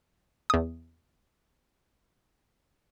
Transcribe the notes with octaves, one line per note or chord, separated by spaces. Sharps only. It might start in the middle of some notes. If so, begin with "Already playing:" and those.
E2 D#6